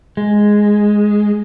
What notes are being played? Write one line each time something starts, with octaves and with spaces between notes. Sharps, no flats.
G#3